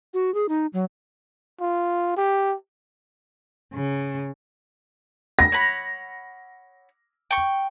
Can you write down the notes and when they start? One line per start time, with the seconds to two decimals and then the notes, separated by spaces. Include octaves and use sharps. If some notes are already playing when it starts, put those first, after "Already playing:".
0.14 F#4
0.34 G#4
0.49 D#4
0.73 F#3
1.60 F4
2.17 G4
3.74 C#3
5.39 A#6
5.52 C#5 F#5 B5
7.31 G5 C#6